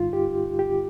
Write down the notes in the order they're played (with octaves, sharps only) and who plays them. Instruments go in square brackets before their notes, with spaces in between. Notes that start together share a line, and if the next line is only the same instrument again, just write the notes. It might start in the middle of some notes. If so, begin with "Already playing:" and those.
Already playing: [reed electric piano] G2 D3 G3 D#4 F4
G4
G4